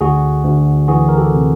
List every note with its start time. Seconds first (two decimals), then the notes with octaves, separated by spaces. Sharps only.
0.01 D2 F#4 G#4
0.44 D2
0.88 E3 F#4 G#4
1.09 A#4
1.17 G4 A4
1.33 C3